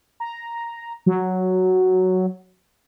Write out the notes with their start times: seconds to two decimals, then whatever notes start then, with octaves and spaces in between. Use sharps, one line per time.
0.20 A#5
1.06 F#3